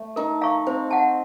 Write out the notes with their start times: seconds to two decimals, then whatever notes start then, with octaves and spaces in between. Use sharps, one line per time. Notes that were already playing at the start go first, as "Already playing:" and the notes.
Already playing: A3
0.16 D#4 A#4
0.42 F5 A#5 C#6
0.67 C4 C5
0.91 F#5 A5